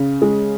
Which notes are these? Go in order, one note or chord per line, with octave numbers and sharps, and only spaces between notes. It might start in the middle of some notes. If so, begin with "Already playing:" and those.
Already playing: C#3
G#3